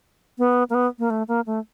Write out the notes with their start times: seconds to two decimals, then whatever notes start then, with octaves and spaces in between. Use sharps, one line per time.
0.38 B3
0.70 A#3
0.74 B3
0.99 A#3
1.10 A3
1.28 A#3
1.46 A3